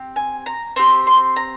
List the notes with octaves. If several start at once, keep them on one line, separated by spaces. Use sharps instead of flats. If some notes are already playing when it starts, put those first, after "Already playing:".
Already playing: C4 G4
G#5
A#5
C4 G4 C6
C6
A#5